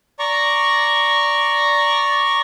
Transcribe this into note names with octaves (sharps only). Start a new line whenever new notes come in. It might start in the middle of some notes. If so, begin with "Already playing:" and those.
D5 A#5 C#6